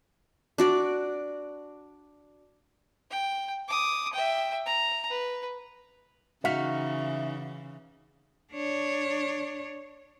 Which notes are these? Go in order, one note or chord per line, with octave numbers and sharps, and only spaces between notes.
D4 F#4 D5
G5
D6 D#6
E5 G5
A#5
B4
C#3 E3 D#4 F#4 E5 F5
D4 C#5